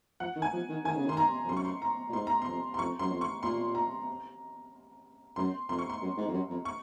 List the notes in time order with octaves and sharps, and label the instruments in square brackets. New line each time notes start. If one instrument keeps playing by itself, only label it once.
[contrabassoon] F3 [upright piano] F#5
[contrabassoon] D#3
[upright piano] G#5
[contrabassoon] F3
D#3
[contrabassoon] D#3 [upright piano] G#5
[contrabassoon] C#3
[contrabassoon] D#3 [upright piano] C6
[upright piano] A#5
[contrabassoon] F2
[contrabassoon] F#2 [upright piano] C6
[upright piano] C#6
C6
A#5
[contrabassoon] A#2
[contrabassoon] G#2 [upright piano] C6
[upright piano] A#5
[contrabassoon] F2 [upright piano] C6
[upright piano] C6
[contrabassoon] F2 [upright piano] C#6
[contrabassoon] F#2 [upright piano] C6
[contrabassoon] F2
[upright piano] C#6
[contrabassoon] A#2 [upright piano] C6
[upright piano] A#5
[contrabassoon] F#2 [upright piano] C6
[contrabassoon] F2 [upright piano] C6
[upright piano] C#6
C6
[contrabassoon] F#2
G#2
F2
F#2
F2
[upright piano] C#6